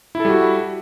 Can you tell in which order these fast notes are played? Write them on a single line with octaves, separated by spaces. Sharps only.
E4 A4 G3 F#4